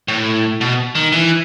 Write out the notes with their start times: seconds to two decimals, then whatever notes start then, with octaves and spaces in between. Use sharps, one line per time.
0.08 A2
0.61 B2
0.95 D#3
1.12 E3